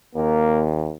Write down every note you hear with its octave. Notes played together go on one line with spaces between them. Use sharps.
D#2 A#3